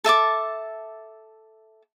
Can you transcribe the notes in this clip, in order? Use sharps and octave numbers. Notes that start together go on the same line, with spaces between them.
A4 E5 A5 D6